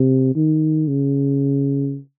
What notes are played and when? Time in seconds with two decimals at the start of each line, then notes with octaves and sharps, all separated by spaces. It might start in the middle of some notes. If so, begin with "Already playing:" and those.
Already playing: C3
0.36 D#3
0.88 C#3